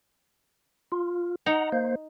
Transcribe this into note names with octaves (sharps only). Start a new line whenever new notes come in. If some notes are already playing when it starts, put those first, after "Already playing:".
F4
D#4 F#5 A#5
A#3 C5